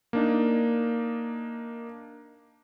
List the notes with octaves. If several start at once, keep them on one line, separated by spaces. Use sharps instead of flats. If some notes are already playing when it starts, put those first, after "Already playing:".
A#3 D4 D#4